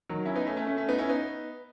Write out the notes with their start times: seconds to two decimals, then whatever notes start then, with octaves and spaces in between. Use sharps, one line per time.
0.09 D#3 F#3
0.25 C#4 E4
0.35 B3 D#4
0.46 A3 C#4
0.57 A3 C#4
0.67 A3 C#4
0.77 A3 C#4
0.88 B3 D#4
0.98 C#4 E4
1.09 B3 D#4